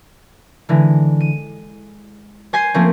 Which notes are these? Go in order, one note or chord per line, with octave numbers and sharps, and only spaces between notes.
D3 E3 G#3
D#7
C5 G#5 G#6 C7 D#7
F3 A3 A#3 C4 C#4